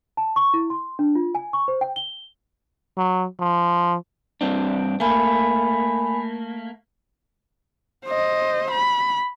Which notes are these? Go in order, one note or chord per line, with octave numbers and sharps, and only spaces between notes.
A5
C#6
E4
C6
D4
F4
G#5
C#6
C5
G5
G7
F#3
F3
G2 C4 D4
A3 A#3 G#5 B5
C5 D#5
B5